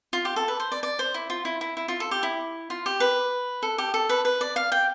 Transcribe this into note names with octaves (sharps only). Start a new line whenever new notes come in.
F4
G4
A4
B4
C5
D5
D5
C5
E4
F4
E4
E4
E4
F4
A4
G4
E4
F4
G4
B4
A4
G4
A4
B4
B4
D5
F5
G5